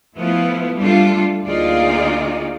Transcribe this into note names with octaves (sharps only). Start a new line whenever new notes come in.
F3 A3 B3 E4 F4 B4
G3 A3 D4 F4 A4
D2 A#3 D#4 F4 G#4 D5